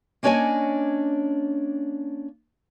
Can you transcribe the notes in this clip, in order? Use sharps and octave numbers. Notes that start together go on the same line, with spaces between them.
A#3 C#4 D4 C#5 D#5 G#5